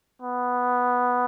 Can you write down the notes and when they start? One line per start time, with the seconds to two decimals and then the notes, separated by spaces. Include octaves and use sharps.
0.22 B3